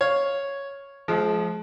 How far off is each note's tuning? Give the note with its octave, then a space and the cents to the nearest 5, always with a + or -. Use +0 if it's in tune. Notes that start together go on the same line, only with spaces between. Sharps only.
C#5 +0 F5 +0
F3 +0 G#3 +35